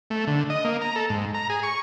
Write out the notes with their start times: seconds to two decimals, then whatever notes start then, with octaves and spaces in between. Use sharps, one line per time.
0.10 A3
0.27 D3
0.50 D#5
0.65 A#3
0.81 A#5
0.96 A4
1.10 G#2
1.34 A#5
1.50 G#4
1.63 C#6